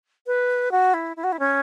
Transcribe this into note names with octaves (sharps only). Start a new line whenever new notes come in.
B4
F#4
E4
E4
F#4
E4
C#4